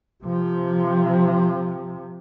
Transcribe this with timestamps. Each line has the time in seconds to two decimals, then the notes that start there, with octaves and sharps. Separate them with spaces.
0.24 C3 F3